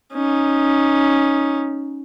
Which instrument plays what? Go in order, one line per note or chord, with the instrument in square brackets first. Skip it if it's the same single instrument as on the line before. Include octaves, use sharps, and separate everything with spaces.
[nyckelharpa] C#4 D#4